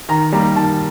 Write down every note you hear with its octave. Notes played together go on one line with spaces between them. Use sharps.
D#3 A#5
G3 A#3 D#4 A#5
D#3 A5